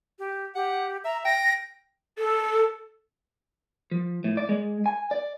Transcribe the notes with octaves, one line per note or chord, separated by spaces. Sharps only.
G4
G4 F#5
E5 A#5
G5 A#6
A4
F3
A2
D5
G#3
G#5
D5